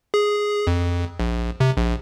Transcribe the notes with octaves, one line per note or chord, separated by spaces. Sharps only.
G#4
F2
A#1
C3
A#1